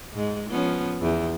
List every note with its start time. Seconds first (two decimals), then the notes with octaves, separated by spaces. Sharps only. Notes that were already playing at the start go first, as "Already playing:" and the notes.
0.13 G#2 G#3
0.50 F3 B3 C#4
1.02 E2